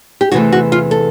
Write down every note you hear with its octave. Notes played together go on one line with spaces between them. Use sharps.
G4
E2 C3 E3 A3 F#4
F#4
F4
A4